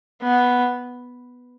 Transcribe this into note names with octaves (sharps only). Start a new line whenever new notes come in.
B3